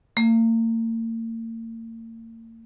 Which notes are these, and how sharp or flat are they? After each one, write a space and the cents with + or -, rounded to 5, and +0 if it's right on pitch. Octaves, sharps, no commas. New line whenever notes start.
A#3 -45